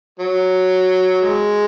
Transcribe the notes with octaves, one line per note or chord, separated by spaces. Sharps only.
F#3
G#3